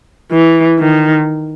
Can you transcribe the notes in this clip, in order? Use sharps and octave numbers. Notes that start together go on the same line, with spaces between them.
E3
D#3